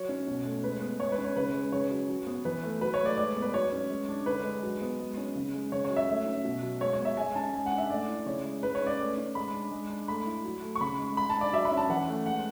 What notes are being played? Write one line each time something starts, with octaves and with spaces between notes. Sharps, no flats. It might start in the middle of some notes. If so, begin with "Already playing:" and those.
Already playing: F#3 C#5
C#4
B2
A3
G#3 B4
B3
G#3 C#5
B4
C#4
C#5
C#3 B4
G#3
C#3 C#5
F#3
F#3
B3
E3 B4
A3
F#3 B4
C#5
A3
D5
G#3 D5
B3
B4
F#3 C#5
C#4
G#3
D4
D3 B4
G#3
F#3
B3
G#3
C#4
C#3
G#3
C#3 C#5
C#5
F#3
E5
A3
C#4
B2
F#3
G#3 C#5
C#5
B3
E5
G#3 G#5
C#4 A5
G#3 G#5
F#5
D4
E5
A3 D5
E4
C#3 C#5
G#3
G#3 B4
C#5
C#4
D5
A3
C#4
G#3 B5
D4
G#3
D4
A3 B5
E4
F#3
A3
C#6
C#3 B5
G#3
G#3 B5
A5
D4
D5
F#3 E5
B5
C#4
A5
E3 F#5
A3
G#3 F#5